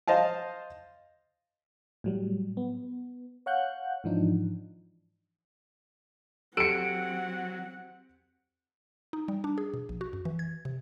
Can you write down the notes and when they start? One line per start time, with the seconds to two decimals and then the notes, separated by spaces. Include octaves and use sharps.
0.08 C5 D#5 F5 A5
2.04 A2 F#3 G3
2.57 B3
3.46 C#5 F5 F#5 F#6 G6
4.04 G#2 E3 F3 D4 D#4
6.57 F#3 C4 G4 A4 F#5 C#7 D7
9.13 D#4
9.28 G3
9.44 D4
9.58 G#4
9.74 B2
9.89 A#1
10.01 F#4
10.13 F#2
10.25 E3
10.39 G#6
10.65 C3